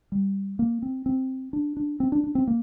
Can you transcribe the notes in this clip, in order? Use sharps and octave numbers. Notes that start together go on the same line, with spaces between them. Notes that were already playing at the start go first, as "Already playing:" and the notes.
G3
A#3
C4
C4
D4
D4
C4
D4
D4
C4
A#3